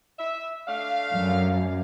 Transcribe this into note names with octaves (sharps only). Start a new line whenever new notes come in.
E5
A3 D4 F5
F#2